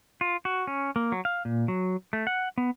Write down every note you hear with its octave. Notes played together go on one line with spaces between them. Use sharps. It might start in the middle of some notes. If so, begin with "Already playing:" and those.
F4
F#4
C#4
A#3
F#3
F5
A#2
F#3
A3
F#5
B3